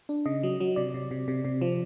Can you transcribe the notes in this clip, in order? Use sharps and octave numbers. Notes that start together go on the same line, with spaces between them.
D4
C#3 D#5
F#3
F#3
C3 D5
C3
C3
C3
C3
F3